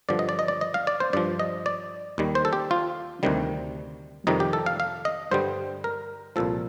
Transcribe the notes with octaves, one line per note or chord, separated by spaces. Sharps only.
G2 D3 F3 D5
D#5
D5
D#5
D5
D#5
F5
D5
C5
G2 F3 D5
D#5
D5
D#2 D#3 G3
C5
A4
G4
F4
D2 C3 D#3 G3
F2 C3 D#3 G3 D#4
G4
A4
F5
F5
D#5
G2 D3 G3 C5
A#4
C2 A#2 F3 A4